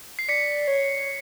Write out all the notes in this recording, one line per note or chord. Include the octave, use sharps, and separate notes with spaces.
C7
D5 B6 C#7
C#5